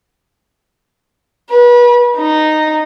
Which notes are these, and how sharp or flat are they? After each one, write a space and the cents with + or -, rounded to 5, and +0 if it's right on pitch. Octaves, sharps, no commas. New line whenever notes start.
B4 -35
D#4 -10